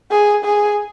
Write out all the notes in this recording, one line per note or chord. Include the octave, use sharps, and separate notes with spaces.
G#4
G#4